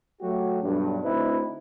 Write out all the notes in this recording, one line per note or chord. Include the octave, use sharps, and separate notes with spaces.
F#3 A3 F#4 G4
B1 G2
D2 C4 D#4 E4 B4